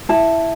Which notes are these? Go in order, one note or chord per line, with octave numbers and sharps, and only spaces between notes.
E4 A5